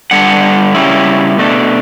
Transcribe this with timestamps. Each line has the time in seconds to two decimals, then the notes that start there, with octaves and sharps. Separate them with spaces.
0.11 G2 D3 G3 F#5
0.74 C#3 G3 C#4 E4
1.38 B2 A3 D4